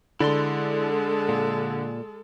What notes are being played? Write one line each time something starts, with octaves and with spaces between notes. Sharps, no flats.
D3 G#3 E4 A4 D5 C6
A#2